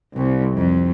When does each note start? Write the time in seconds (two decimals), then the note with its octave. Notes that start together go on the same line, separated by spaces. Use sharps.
0.15 C2
0.56 F2